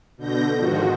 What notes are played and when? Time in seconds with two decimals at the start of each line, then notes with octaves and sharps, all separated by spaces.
0.17 B2 D3 G6 A#6
0.57 G#2 D#3 F3 F#4